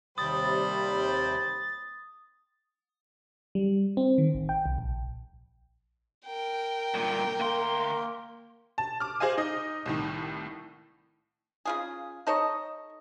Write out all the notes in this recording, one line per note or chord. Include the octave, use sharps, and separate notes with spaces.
D#2 C3 G3 C5 G5 B5 D#6 A6
G3
C4
D#3
A1
G5
C2
A#1
A#4 G5
G2 A#2
D2 A#3 C6
A5
D6 F6
G#4 C5 D#5 F5 G#5
D#4 D#5
C2 A2 D#3
C#3 F4 G#4
D#4 A4 C#5 D#5